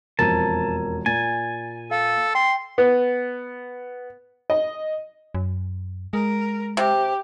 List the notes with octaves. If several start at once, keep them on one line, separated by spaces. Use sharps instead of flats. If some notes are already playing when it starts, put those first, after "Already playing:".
E1 F2 A#4 A5 A#5 G#6 D#7
A#2 G#5 A#5 A6
A4 F5
G5 C6
B3
D#5
F#2
G#3 A#4
C3 G4